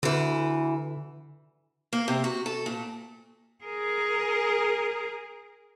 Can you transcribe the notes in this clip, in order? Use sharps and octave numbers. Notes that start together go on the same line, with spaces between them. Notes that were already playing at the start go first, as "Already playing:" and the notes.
D2 D3 E3
A#3
C3
F#4
A4
A#2
G#4 A#4